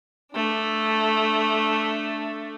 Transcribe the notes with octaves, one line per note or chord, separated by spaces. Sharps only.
A3 D4